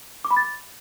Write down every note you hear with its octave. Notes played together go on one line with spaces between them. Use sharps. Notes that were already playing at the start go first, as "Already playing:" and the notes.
D6
B5
A6